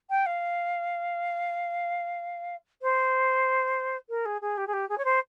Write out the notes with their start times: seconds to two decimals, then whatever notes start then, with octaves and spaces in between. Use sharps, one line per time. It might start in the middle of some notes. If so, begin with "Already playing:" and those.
0.10 G5
0.26 F5
2.82 C5
4.09 A#4
4.25 G#4
4.41 G#4
4.57 G4
4.67 G#4
4.73 G4
4.89 G#4
4.98 C#5
5.05 C5